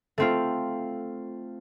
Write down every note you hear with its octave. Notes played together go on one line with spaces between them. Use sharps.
A3 C4 F4